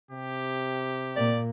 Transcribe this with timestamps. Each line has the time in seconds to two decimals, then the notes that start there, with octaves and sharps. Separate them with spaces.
0.11 C3 G4
1.16 A#2 A#3 D5